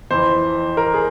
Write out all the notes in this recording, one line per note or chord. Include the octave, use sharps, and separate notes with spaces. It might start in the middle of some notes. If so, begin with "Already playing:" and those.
F2 E3 C5
A#4
G#4